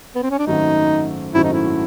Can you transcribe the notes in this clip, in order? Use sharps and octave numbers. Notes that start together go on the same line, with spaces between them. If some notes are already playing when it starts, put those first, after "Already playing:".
B3
C4
C#4
D4
G#1 F#2 D#3 F#3 A3 D#4
G#1 F#2 D#3 F#3 A3 E4
D#4
E4